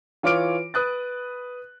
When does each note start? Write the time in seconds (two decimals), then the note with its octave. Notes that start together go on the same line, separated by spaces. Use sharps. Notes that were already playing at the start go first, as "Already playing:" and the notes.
0.23 E3 F4 C#5 D6 F6 D7
0.74 B4 D#6 F#6 A6